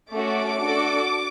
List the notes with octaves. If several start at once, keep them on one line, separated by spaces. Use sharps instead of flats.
A3 C#4 F#4 D6
D4 F#4 A4